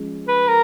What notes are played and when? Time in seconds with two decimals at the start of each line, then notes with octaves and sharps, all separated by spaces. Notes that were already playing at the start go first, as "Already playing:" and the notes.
Already playing: F3 G#3 C#4
0.28 B4
0.48 A#4